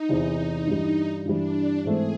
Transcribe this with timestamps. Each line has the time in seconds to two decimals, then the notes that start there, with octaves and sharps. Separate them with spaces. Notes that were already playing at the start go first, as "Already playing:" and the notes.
Already playing: D#4
0.09 E2 C3 E3
0.67 G2 E3 G3
1.25 G2 E3 G3 D4
1.84 G#2 E3 A3 C4 G#4